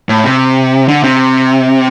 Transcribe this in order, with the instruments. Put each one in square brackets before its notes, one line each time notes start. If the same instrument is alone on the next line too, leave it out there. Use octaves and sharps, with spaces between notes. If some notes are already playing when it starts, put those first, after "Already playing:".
[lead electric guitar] A2
C3
D3
C3